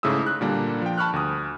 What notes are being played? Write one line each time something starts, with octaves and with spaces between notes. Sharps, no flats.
G#2 C#3 A3 E4 D#6 E6
F#6
A#2 D3 G3 A#3 D4
F3 G5
A5 B5 C#6 F6 F#6
D2 D#6